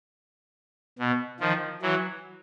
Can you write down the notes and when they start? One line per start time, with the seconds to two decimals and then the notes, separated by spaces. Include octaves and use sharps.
0.99 B2
1.40 D#3 F3
1.82 E3 F#3